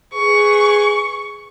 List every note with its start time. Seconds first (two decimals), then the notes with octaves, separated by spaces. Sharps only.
0.14 G#4 B4 C#6